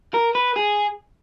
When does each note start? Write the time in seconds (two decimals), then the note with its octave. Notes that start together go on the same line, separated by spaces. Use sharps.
0.14 A#4
0.35 B4
0.56 G#4